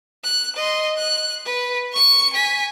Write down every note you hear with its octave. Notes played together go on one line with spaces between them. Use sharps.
F#6
D#5 C6
F#6
B4
C#6 C#7
G#5 B6